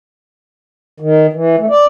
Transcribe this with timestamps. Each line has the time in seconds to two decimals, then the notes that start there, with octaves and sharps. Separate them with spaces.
1.00 D#3
1.33 E3
1.58 A3
1.70 D5